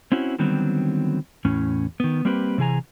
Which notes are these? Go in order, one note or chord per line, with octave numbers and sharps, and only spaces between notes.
C4 C#4 E4 F#4
D3 D#3 F#3 G3 B3 C4
E2 A2 C#4
D#3 B3
G3 A#3 C4 G4 B4
C3 E3 G#4 G#5 A#5